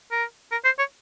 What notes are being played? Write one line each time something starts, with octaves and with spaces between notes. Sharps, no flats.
A#4
A#4
C5
C#5